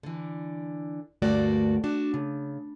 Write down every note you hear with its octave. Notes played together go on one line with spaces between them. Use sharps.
D3 E3
D2 G2 A3 A#3 F#4 D5
D4 F#4
C#3